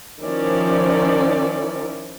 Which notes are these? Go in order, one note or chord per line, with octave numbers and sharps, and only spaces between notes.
D#3 F3 C#4 E4 D5